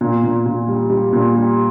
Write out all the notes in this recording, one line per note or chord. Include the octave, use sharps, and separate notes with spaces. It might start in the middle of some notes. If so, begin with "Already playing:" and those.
A#2
A#2
A#2
G3
G3
A#2
G3